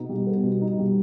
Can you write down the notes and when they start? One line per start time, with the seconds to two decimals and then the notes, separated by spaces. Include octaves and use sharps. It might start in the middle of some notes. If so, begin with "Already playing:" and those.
Already playing: B2 B3 D#4
0.09 G3
0.27 B3
0.44 B2
0.61 D#4
0.79 G3